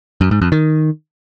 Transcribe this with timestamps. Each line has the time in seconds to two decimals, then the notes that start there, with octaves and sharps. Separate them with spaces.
0.21 F#2
0.31 G#2
0.42 F2
0.52 D#3